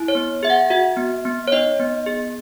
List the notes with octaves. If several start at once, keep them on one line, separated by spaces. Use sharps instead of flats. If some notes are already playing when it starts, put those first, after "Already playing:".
Already playing: E4
C#5
B3
G#4 E5
F#5
F#4 E5
B3
B3
C#5
D#4 D#5
B3
G#4